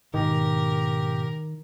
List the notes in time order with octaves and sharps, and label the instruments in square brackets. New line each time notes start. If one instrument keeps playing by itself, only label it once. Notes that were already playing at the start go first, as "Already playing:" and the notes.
[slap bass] G#2 B2 [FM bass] D#3 [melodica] G4 [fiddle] A#4